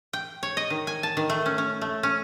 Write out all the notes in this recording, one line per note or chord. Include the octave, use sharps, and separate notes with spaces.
G5
C#5
D#5
D#3
G#5
A5
D#3
A3
C#4
C#4
A3
C#4